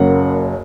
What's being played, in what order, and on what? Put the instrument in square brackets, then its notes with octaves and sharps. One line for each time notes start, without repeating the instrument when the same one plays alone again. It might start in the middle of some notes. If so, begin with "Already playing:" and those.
Already playing: [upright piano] F#1 F#2 F#3 A#3 F#5